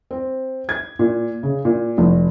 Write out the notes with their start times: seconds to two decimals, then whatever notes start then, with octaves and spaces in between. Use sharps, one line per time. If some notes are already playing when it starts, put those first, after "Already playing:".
0.11 C4
0.69 G#6
0.99 A#2
1.43 C#3
1.65 A#2
1.98 F1